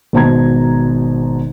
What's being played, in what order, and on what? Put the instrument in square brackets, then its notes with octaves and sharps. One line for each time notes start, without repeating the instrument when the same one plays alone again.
[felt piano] G#1 B2 C5 A5 A#5 G#6